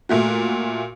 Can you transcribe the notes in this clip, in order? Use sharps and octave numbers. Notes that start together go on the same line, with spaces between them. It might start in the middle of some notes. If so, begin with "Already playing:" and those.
A#2 A3 F#4